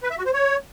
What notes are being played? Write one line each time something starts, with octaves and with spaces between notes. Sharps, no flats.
B4
E5
F#4
C5
C#5